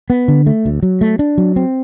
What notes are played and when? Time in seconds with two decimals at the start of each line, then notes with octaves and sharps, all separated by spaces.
0.10 B3
0.28 D3
0.47 A3
0.65 D2
0.83 F#3
1.01 A3
1.19 D4
1.38 F#3
1.56 C4